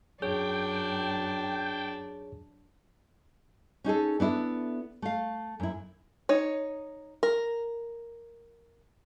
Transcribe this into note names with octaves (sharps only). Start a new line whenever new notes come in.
F#2 D4 G#4 C#5 G5
C#4 D#4 G#4 A4
B3 D4 E4 A4
A3 F5
F#2 E4
D#4 C#5
A#4